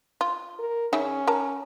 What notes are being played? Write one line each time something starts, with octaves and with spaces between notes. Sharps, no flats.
F4
A#4
C#3 C#4 D#4 E5
A#4 A5 A#5